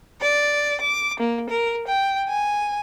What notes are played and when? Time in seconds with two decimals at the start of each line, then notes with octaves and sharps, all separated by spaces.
0.22 D5
0.82 D6
1.20 A#3
1.50 A#4
1.87 G5
2.30 G#5